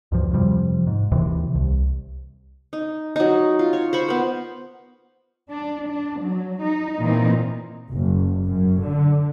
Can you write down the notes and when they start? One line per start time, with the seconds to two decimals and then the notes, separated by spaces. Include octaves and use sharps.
0.12 D2 G2 F3
0.33 F2 C3 F3 G3
0.87 G#2
1.12 D#2 C3 E3
1.55 C2
2.73 D#4
3.16 F#3 D#4
3.59 F4
3.73 C#5
3.93 C5 B5 C#6
4.08 B3 A#4
5.48 D4
5.88 D4
6.19 F#3
6.62 D#4
7.01 A#2 E3 A#3 C4 D#4
7.91 F#1
8.48 F#2
8.81 D3